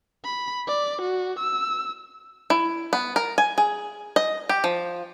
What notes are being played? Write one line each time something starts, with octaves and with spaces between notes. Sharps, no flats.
B5
D5
F#4
E6
E4
B3
A#4
G#5
G#4
D#5
G4
F3